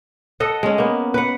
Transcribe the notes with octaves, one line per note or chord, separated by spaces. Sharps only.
A4 D#5 F#5
G#3 C#4
A#3 B3
B4 F#5